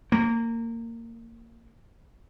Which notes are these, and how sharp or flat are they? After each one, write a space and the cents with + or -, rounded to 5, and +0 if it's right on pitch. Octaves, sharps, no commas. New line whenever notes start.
A#3 -20